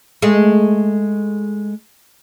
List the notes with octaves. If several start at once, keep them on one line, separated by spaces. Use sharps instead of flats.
G#3 A3